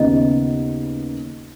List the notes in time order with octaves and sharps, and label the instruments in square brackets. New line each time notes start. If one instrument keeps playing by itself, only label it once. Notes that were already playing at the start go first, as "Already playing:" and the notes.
Already playing: [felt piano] D#2 C#3 B3 D#4 [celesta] D#5